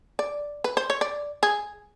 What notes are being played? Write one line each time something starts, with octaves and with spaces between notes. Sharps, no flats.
D5
B4
C5
C#5
D5
G#4